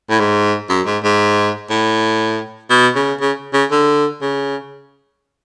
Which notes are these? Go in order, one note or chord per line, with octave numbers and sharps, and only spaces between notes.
A2
G#2
F#2
G#2
G#2
A2
B2
C#3
C#3
C#3
D3
C#3